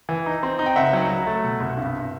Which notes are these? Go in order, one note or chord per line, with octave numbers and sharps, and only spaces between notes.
E3
D#4
C4
D#4
G5
C#2 E5 F#5
F#3
F#3
A3
B2
C2
G2
G2